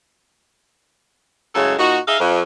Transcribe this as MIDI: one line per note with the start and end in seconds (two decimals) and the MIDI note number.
1.55 1.74 42
1.55 1.74 45
1.55 1.74 49
1.55 1.74 56
1.55 1.74 69
1.79 1.99 46
1.79 1.99 63
1.79 1.99 66
2.08 2.20 63
2.08 2.20 68
2.08 2.20 76
2.08 2.20 77
2.20 2.42 41